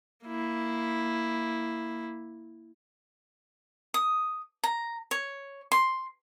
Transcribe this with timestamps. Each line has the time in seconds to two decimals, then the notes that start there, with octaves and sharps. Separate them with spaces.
0.25 A#3 E4
3.94 D#6
4.64 A#5
5.11 C#5
5.72 C6